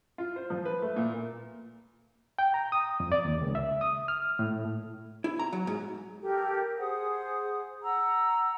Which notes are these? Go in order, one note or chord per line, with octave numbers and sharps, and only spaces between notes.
F4
C5
F3
B4
A3
A#2
G5
A#5
D#6
F2
D5
D#2
C#2
E5
D#6
F6
A2
E4
A#5
F#3
G#2
G4 A4 A#4
G#4 C5 F#5 D#6
F#5 A#5 E6